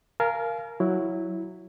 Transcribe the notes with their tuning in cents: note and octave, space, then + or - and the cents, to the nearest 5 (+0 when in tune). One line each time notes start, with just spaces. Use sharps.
A#4 +0 F5 -20 G#5 +45
F#3 +0 E4 +0